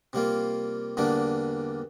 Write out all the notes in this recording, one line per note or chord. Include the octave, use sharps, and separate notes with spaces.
C3 G3 A#3 F4
E2 D3 G3 A#3 D4